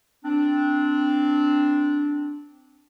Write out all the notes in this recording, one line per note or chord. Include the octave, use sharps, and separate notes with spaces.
C4 D4